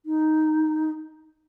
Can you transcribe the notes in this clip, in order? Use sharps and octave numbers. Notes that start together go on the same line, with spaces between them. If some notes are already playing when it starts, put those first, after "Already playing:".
D#4